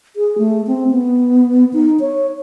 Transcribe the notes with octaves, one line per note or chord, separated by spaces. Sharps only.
G#4
A3
C4
B3
D#4
C#5